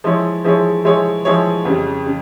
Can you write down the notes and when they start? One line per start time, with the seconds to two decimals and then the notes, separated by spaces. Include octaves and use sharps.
0.04 F3 G#3 E4 G#4 C#5
0.44 F3 G#3 E4 G#4 C#5
0.85 F3 G#3 E4 G#4 C#5
1.25 F3 G#3 E4 G#4 C#5
1.65 F2 C#3 G3
2.06 C#3